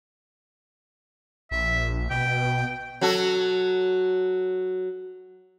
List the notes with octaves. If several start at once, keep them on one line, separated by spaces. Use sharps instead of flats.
A#1 E5
B2 G5
F#3 F#4 A4